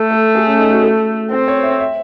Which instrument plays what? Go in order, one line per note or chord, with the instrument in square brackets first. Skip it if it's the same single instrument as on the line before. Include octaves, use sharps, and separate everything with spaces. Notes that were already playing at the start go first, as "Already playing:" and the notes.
Already playing: [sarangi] A3 [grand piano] A4
[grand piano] A4
G#4
C#4
D#4
F#4
A4
[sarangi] C4 [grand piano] C5
[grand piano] C#5
E5
E5